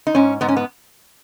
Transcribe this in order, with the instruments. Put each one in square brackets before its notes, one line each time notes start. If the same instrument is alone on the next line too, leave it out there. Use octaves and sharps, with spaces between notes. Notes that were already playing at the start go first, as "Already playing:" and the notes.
[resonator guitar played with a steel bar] D#4
G#2 C#4
G#2 B3
C#4
B3